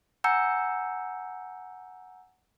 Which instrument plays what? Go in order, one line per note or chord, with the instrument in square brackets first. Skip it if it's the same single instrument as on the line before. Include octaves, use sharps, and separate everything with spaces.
[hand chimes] F#5 G#5 A#5 E6 G6 C#7